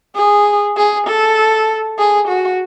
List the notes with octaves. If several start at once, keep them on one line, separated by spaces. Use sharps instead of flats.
G#4
G#4
A4
G#4
F#4